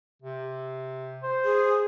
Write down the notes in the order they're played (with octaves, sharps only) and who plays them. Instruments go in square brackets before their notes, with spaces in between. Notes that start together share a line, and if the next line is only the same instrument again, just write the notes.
[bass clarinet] C3
C5
[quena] G#4